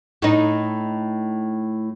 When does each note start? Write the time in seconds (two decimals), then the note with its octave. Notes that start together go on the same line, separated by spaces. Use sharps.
0.22 A2 D#4